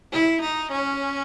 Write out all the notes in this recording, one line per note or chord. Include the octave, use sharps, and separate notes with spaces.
E4
D#4
C#4